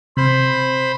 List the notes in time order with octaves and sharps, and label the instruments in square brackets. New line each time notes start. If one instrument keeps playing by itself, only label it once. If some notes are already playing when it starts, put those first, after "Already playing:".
[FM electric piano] C3 [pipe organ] C5 B5